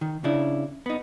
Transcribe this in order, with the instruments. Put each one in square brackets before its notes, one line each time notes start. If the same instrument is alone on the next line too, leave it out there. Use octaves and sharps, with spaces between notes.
[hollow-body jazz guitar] D#3
C#3 D4 E4
B3 D#4